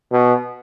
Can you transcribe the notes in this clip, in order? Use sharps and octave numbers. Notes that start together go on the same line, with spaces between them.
B2